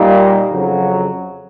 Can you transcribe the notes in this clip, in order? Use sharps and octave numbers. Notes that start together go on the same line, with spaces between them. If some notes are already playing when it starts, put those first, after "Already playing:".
Already playing: A#2 G3 A#3 D#4
F2 C#3 F#3